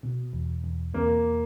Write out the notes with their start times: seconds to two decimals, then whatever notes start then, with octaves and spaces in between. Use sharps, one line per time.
0.03 B2
0.33 E2
0.64 E2
0.94 E2 A#3